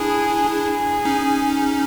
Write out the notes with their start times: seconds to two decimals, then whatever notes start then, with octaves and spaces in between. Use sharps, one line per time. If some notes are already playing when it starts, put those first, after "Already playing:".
Already playing: D4 E4 G#4
0.49 G#4
1.05 C#4 D#4